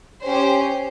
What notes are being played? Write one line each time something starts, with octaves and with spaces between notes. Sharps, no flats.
C#4 G4 C5